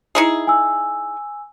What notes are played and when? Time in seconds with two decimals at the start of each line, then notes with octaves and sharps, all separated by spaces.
0.15 D#4 E4 G#4
0.47 G#5 E6